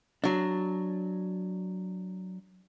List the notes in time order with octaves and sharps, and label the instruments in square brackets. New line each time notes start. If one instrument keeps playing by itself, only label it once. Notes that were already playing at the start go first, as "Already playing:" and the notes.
[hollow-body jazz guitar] F#3 D4